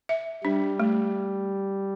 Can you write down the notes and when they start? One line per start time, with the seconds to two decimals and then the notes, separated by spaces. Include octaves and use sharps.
0.09 E5
0.44 G3 D4
0.80 A3